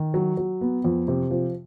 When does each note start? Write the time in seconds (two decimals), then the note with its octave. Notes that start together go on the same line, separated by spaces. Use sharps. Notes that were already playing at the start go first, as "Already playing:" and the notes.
Already playing: D#3
0.14 F#3
0.37 F#3
0.61 B3
0.84 F2
1.08 C3
1.31 F3